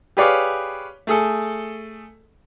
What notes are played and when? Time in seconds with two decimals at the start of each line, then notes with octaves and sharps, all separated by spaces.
0.17 G4 G#4 B4 C#5 D5 F5
1.07 A3 G#4 A4